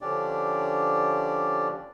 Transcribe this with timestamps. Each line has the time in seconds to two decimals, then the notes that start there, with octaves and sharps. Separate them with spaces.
0.01 D3 F3 C#4 D4 G4 D5